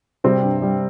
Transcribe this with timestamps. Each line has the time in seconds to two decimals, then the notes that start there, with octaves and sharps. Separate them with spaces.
0.24 C3 G3 C4
0.43 G2
0.62 G3